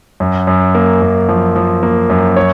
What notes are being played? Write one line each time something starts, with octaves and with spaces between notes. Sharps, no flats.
F#2
F#2
A#3
F#2
F3
F3
A#3
F#2
C#5